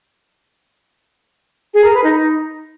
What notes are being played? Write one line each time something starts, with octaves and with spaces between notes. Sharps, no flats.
G#4
A#4
B4
D#4